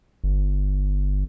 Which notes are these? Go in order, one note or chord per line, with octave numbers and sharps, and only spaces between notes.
G1